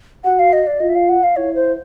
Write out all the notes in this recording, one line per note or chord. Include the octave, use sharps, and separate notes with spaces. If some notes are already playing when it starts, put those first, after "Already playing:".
F#4 F#5
F5
D#5
D5
F4 D#5
E5
F5
F#5
F5
E4 C#5
C5